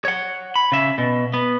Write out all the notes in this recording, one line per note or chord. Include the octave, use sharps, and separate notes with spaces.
C#5 F#5
B5
C#3 E5
B2
B3